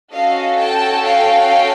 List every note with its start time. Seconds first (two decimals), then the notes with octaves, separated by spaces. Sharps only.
0.13 C#4 F#4 A4 D#5 F5
0.59 G5 A5
1.05 F5 G5